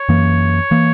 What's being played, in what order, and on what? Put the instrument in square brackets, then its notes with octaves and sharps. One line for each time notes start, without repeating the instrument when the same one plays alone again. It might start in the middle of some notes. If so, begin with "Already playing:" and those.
Already playing: [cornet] C#5
[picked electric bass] F#2 E3 A#3
E3 A#3